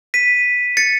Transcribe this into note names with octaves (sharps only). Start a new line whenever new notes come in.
B6 D#7
A6 C#7